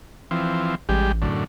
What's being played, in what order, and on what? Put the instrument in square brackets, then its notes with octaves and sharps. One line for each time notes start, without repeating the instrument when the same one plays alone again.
[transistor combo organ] E3 F3 C4
[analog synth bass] A1 [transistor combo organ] G3 G#3 G4
[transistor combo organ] F#2 A2 D3